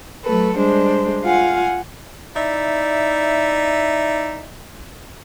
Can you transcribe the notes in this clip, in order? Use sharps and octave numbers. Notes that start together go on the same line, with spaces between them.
F#3 A3 A4 B4
G3 G#3 D4 C5
F4 F5 F#5 G#5
D#4 E4 D5 E5